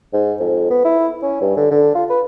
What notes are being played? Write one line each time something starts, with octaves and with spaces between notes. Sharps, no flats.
G#2
F2
B3
E4
C#4
G2
D3
D3
F4
B4